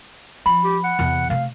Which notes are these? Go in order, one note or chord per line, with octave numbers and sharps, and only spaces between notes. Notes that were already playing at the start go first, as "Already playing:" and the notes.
F3 B5
G4
F#5
E2 C3
C3 A3 F5